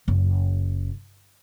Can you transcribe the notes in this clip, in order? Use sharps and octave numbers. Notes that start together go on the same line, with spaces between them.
F#1